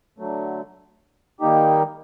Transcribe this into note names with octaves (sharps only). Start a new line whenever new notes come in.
D3 F#3 A3
D#3 G3 A#3 D#4 G4